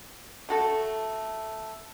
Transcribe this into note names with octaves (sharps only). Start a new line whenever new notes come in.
A3 F#4 A4